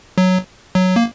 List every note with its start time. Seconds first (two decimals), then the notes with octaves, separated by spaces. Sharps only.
0.18 F#3
0.75 F#3
0.96 A#3